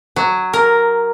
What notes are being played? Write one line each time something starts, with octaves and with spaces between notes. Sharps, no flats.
F#3
A#4